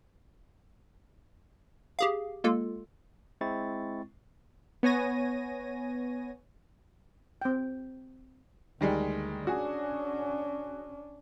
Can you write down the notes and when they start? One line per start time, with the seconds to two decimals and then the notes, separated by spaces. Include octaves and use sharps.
1.99 G4 G#4 F5
2.44 G#3 A#3 F4 A4
3.41 G#3 C4 E4 C#6 A6
4.83 B3 C#5 G#5 A#6 D#7
7.42 C4 G5
8.81 D2 D#3 G3 G#3
9.47 C#4 D4 F#4 G#4